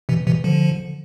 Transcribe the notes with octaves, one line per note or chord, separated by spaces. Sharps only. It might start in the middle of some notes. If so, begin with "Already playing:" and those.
C3 E3
C3 E3
D3 F3